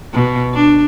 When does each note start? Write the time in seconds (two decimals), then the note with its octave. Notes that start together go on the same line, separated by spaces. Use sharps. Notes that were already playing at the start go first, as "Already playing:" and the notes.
0.13 B2
0.54 D4